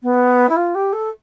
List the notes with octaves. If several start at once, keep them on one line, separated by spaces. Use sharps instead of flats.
B3
E4
F4
G4
A4